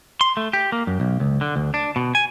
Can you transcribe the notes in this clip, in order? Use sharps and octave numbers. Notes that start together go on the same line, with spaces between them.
C6
A3
G4
A#3
F#2
B1
C#2
D3
D2
D4
B2
G#5